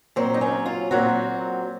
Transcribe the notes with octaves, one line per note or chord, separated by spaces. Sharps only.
A#2 F#3 C4 C5
D#4
C#4
F4
A#2 F#3 C4 F#4